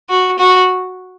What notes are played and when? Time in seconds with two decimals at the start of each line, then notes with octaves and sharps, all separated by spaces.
0.10 F#4
0.39 F#4